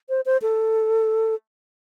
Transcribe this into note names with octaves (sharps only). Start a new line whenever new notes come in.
C5
C5
A4